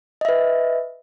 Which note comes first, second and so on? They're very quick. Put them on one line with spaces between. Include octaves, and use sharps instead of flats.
D#5 E5 B4